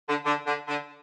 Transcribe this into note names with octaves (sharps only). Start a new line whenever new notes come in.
D3
D3
D3
D3